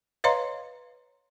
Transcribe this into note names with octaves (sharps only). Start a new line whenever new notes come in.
B4 C#5 D#5 F5 A#5 C6